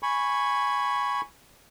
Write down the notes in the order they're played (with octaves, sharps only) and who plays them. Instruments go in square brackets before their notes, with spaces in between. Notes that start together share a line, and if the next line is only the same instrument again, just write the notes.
[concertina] G#5 B5 C#6